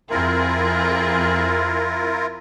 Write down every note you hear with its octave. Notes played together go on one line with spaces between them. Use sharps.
F2 C4 E4 F4 G#4 A#4